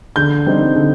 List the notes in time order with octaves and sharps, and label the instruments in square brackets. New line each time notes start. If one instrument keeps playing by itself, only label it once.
[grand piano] D3 G6
G3 C4 D#4
D3